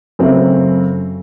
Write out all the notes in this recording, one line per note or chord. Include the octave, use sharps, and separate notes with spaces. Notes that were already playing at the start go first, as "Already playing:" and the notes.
F#2 C#3 F#3 A3 C4